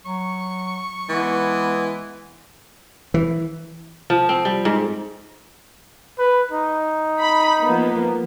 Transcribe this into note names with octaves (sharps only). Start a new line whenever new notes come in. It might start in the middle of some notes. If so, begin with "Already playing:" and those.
F#3 C#6
E3 G#3 B3
E3
F3
C4
G3
G#2
B4
D#4
B5
F3 A#3 B3